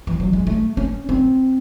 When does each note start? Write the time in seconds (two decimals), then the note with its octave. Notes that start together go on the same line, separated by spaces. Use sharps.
0.07 E3
0.20 F#3
0.33 G#3
0.47 A3
0.77 C#4
1.09 C4